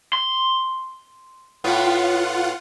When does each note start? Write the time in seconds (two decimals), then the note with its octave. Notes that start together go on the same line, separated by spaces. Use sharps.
0.13 C6
1.64 A2 B3 F4 F#5